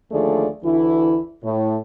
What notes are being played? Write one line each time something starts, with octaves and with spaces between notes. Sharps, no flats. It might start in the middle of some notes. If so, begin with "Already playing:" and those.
D#2 D3 F3 A3 G#4 D5
D2 E3 E4
A2